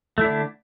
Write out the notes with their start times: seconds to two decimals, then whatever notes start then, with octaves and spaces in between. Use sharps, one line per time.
0.18 A3
0.21 E4
0.25 D4
0.28 D3